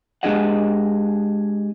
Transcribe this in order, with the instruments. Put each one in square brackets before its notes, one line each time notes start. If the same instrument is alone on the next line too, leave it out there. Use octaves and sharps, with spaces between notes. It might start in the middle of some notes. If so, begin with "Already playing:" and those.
[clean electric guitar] G#3 D4 G4 G#4 D#5 F#5